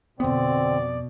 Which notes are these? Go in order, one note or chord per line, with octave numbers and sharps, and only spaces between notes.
F2 B2 D3 B3 C4 D5